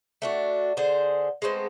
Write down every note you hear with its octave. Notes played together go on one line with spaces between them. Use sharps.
A3 D4 F#4
D3 G#4 C5
G#3 A3 B3 C4